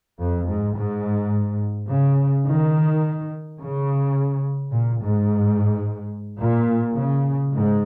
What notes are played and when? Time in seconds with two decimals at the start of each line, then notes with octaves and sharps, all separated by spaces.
0.20 F2
0.48 G#2
0.76 G#2
1.88 C#3
2.46 D#3
3.58 C#3
4.70 A#2
4.99 G#2
6.40 A#2
6.96 C#3
7.53 G#2